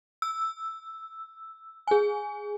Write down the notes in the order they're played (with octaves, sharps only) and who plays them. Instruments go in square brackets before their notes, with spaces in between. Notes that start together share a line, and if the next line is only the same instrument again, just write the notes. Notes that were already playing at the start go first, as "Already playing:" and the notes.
[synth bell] E6
G#4 G#5